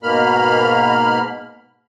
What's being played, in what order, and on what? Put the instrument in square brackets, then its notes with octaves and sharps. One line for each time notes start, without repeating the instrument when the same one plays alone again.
[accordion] G#2 B2 A#3 B5 F6